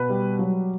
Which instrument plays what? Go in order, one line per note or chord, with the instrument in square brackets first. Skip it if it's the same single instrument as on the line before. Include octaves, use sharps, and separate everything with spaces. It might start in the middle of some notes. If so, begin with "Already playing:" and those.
Already playing: [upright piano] B2 B4
G3
F#3